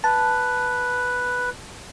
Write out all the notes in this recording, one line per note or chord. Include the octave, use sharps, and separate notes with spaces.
B4 A5